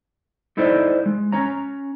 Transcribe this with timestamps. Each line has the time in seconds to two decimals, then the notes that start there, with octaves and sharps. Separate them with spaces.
0.57 D#4 E4 A4 C5 D5 D#5
1.06 G#3
1.32 C#4 C#5 A#5